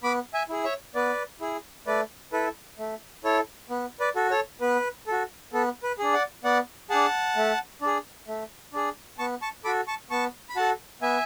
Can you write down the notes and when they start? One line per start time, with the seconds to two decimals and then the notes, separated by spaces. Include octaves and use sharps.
0.03 B3 B5 D6
0.34 E5 G#5
0.49 E4 G#4
0.64 C#5 E5
0.95 B3 B4 D5
1.41 E4 G#4
1.86 A3 B4 D5
2.32 E4 A4 B4
2.79 A3
3.24 E4 A4 C#5
3.70 B3
4.00 B4 D5
4.16 F#4 A4
4.31 A4 C#5
4.61 B3 B4
5.07 F#4 A4
5.53 B3 A4
5.83 B4
5.99 D4 G#4
6.14 D5 F#5
6.44 B3 D5 F#5
6.90 D4 G#4 F#5 A5
7.36 A3
7.82 D4 G#4
8.28 A3
8.73 D4 G#4
9.18 B3 A5 C#6
9.42 A5 C#6
9.64 F#4 A4 B5 D6
9.87 A5 C#6
10.10 B3 A5 C#6
10.49 B5
10.56 F#4 A4 F#5 A5
11.02 B3 E5 G#5